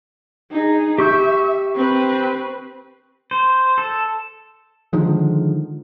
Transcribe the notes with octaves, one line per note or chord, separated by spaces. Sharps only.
D#4 G#4
G4 E5 C#6 G6
C4 B4
C5
A4
D3 D#3 F3 G#3